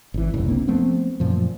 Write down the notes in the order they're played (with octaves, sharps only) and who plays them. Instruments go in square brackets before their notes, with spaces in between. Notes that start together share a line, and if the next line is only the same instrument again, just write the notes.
[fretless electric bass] G#1 E3
F#1 C2
A#3 C4 D4
F3 A3 B3 C4
F#2 A#2 F3